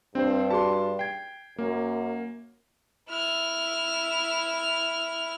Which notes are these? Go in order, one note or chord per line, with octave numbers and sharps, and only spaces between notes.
G2 C4 D4 C5
F#4 G#4 A5 C6
G5 G#6 C7
F#2 A#3
E4 F6